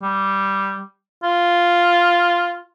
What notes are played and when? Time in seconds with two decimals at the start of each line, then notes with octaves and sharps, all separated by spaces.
0.02 G3
1.24 F4